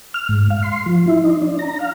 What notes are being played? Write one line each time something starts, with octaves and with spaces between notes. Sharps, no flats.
F6
G#2
F5
C6
F3
E4
D#4
D4
A#5
F5